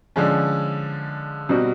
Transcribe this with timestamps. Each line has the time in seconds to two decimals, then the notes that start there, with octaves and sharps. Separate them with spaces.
0.16 D3 F3 G#3 C#4
1.49 B2 G3 C4 D#4 F#4